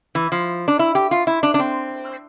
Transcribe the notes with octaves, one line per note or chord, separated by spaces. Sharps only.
E3
F3
D4
E4
G4
F4
E4
D4
D4
C4